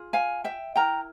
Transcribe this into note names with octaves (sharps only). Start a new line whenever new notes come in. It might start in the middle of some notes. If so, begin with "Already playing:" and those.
Already playing: F4 G#4
F5 G#5
E5 G5
E4 A#4 G5 A#5